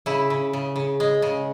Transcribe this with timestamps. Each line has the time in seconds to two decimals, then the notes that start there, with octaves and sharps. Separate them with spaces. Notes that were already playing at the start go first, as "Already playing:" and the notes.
0.06 C#3 E4
0.30 C#3
0.53 C#3
0.76 C#3
1.00 G#3
1.22 C#3